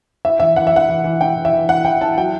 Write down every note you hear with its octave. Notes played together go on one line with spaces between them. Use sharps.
E4 E5
E3 E5
E3 F#5
E5
E4 F#5
E3
E3
E3 G5
E3
E5
E3
E3 F#5
E4 G5
E4 A5
F#3 G5